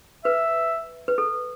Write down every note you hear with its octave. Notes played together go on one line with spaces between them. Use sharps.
B4 E5
B4
A4